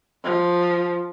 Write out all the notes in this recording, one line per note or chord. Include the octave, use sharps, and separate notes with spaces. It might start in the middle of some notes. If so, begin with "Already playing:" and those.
F3